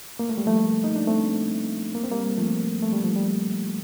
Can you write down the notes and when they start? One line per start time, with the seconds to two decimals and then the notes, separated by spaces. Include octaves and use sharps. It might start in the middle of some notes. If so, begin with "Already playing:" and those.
0.19 A#3
0.29 A3
0.38 G3
0.46 F3 A3
0.84 D#4
0.96 D4
1.07 A3 C4
1.95 A#3
2.04 C4
2.12 G3 A#3
2.38 F3 A3
2.82 A3
2.93 G3
3.04 F3
3.16 G3